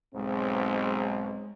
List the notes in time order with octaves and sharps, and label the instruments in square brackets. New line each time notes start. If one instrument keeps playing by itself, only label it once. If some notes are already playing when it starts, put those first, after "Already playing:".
[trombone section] B1 G#2 [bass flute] G#3 [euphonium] C4